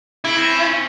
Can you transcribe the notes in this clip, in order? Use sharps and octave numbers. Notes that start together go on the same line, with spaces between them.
C#3 E4
C4 C#4